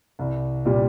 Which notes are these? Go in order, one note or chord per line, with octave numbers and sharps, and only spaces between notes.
C2
A#2 G3